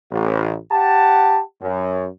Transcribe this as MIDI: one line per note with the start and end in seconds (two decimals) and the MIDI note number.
0.11 0.57 33
0.71 1.40 67
0.71 1.40 78
0.71 1.40 81
1.60 2.07 42